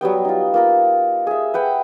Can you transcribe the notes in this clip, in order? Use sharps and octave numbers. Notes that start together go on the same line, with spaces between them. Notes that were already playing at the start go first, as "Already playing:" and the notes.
F#3 G3 B3 G5
D#4 F4
A#3 F4 A#4
G#4 E5
B4 F#5 G5